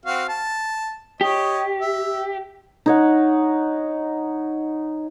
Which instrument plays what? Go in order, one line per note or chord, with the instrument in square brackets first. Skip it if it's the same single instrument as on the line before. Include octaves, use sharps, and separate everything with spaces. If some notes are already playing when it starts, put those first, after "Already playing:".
[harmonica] C4 F#4 F5
A5
[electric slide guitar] G4 [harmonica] C#5 D#5
[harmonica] E5
[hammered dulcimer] D#4 C#5 F#5